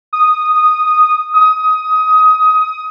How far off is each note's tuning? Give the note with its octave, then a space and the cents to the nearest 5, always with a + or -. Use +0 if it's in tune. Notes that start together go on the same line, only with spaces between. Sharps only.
D#6 -5
D#6 +20